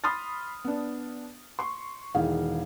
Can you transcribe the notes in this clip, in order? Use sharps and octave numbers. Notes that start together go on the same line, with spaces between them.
B5 C6 D#6 F6 A6
B3 D4
C6 C#6
E1 D#3 E3 G#4 F5